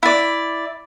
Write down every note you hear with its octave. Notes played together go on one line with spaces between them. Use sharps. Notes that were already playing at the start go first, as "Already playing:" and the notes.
E4 D5